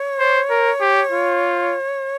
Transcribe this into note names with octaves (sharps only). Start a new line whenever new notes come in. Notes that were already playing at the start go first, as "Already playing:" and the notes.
Already playing: C#5
C5
A#4
G4
F4